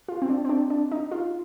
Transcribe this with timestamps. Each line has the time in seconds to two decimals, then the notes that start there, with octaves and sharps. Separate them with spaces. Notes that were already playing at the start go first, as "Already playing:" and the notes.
0.08 F4
0.22 C4
0.29 D4
0.45 C4
0.49 D4
0.70 D4
0.91 D#4
1.12 F4